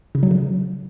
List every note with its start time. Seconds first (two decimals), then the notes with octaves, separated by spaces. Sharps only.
0.15 C#3
0.23 F#3
0.31 C#3